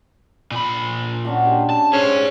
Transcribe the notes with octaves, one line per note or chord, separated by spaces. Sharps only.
A#2 B5
C#4 D4 F#4
G4
A5
C#4 G#4 C5